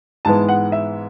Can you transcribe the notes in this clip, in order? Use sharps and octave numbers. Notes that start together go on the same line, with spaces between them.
G#2 E3 G#3 B3 A5
F#5
E5